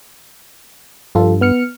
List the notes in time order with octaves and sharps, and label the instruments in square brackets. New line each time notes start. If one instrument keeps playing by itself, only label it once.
[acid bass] G2 [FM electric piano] F3 F4 A4
[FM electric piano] B3 F6 C#7